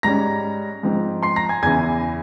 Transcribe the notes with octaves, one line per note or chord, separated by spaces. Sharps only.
G#2 G3 C#4 A#5 A#6
G#2 F3 C4
C6 C7
A#5 A#6
G#5 G#6
E2 C#3 E3 G#5 G#6